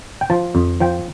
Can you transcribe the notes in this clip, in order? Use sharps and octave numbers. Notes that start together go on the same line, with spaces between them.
G5
F3 A5
F2
F3 G5